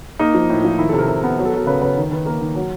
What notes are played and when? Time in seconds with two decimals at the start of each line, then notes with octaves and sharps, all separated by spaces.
0.19 A#3 D#4
0.34 F3
0.50 A2
0.65 F3
0.78 D#3 E4
0.89 A4
0.93 C3
0.99 A#4
1.08 C3
1.24 B3
1.38 F#3
1.45 A4
1.53 F#3 A#4
1.67 C#3 B4
1.82 C#3 B4
1.97 D#3
2.11 D#3 B4
2.26 A#3 A#4
2.41 D#3
2.55 F#3